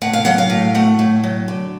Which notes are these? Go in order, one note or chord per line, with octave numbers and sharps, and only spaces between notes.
A2 F#5
F5
F#3 F#5
F5
A2
A3 F#5
A2
F#3
D3